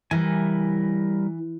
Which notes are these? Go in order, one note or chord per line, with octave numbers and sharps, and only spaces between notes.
E3 G3 A#4 G#5